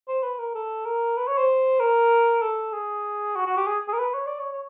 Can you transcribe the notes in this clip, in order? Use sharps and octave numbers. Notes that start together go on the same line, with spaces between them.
C5
B4
A#4
A4
A#4
B4
C#5
C5
A#4
A4
G#4
F#4
F#4
G4
G#4
G#4
A#4
B4
C#5
D5
C#5
C#5